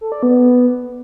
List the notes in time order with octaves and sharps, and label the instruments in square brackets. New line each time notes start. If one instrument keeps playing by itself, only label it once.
[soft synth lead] A4
D5
B3